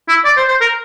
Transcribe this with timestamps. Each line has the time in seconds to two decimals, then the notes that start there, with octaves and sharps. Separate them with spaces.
0.08 E4
0.24 D5
0.37 C5
0.48 C5
0.61 A#4